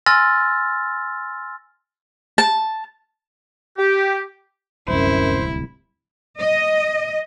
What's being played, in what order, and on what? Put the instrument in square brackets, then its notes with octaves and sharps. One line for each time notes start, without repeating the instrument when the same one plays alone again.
[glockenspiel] G#5 C6 E6 F6 A6 A#6
[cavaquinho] A5
[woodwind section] G4
[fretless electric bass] D1 C2 [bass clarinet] F#2 [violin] E4 [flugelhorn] C5
[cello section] D#5